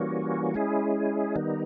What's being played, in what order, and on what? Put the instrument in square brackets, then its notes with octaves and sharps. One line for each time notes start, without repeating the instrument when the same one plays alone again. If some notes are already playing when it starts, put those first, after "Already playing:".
Already playing: [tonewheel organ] E3 G3 A#3 C#4 F#4
G#3 C#4 E4 G#4
D#3 G3 B3 D#4